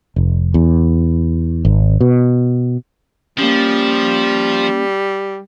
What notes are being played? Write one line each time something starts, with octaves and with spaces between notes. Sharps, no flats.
F1
E2
G#1
B2
F3 G3 A#3 C#4